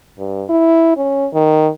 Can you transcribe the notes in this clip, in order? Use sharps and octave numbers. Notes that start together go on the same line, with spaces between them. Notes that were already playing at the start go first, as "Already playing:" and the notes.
G2
E4
C#4
D#3